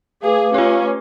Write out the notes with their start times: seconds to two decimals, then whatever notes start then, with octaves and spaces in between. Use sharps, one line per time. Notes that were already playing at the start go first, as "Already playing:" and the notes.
0.23 A3 G#4 B4 F5 D6
0.54 C#4 F4 G4